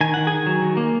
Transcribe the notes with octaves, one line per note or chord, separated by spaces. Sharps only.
D#3 G#5
D#3 F#5
D#3 G#4 G#5
F#3
D#3
A#3